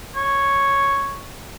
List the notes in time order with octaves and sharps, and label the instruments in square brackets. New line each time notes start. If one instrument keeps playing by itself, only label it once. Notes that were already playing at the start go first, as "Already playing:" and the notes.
[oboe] C#5